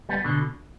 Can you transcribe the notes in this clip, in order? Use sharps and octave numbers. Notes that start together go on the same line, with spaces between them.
G3 B3
B2 D3